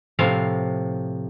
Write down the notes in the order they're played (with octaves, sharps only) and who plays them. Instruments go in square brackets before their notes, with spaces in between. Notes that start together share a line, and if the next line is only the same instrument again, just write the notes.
[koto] A2 C3 F3 F5